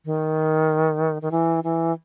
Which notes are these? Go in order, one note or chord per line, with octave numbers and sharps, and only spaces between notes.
D#3
D#3
E3
E3